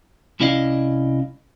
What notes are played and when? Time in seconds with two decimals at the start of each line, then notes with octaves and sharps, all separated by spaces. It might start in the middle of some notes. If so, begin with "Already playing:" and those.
0.40 C2 C#4 E4 D5 D#5 F5